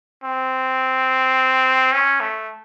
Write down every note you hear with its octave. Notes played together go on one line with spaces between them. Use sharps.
C4
C#4
A3